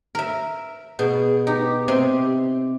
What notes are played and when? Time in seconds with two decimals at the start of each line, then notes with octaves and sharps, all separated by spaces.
0.15 A#4 E5
0.99 B2 G#4
1.47 D#4 G4
1.88 C3 C6